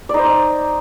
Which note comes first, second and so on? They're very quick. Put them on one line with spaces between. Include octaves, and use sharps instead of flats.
D5 D#4 C5